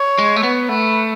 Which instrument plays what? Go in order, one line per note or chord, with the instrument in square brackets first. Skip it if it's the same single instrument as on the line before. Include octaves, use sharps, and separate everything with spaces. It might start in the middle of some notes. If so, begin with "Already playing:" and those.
Already playing: [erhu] C#5
[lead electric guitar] G#3
A3
B3
[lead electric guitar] A3 [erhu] B4